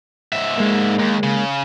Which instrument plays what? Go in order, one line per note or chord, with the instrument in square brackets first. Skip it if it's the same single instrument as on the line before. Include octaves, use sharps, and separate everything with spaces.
[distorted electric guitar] G#2 E5
[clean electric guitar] G#3 A#3
[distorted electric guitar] D#2
C#3